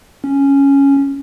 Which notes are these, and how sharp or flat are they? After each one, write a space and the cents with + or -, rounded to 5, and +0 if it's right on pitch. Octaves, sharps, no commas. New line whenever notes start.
C#4 +0